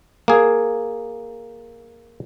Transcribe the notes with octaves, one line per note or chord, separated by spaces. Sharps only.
A#3 G#4